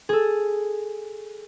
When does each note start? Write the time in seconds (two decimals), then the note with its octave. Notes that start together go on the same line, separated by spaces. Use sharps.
0.09 G#4 A4